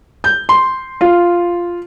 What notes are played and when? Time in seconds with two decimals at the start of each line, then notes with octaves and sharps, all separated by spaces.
0.24 G6
0.49 C6
1.01 F4